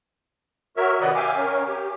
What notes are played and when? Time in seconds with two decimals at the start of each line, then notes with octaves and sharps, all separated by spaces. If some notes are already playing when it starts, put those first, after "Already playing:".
0.77 F#4 A#4 C#5 E5
1.01 C3 D#3 B4 D5 D#5 F#5
1.15 E5 F5 G5 G#5 D6
1.37 C#4 A#4 C#5
1.68 G4